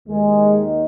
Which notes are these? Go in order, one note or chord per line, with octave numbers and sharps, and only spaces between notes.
D#2 D#3 G#3